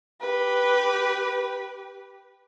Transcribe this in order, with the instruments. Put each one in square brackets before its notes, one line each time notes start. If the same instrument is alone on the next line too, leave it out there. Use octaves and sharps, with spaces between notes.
[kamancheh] G4 B4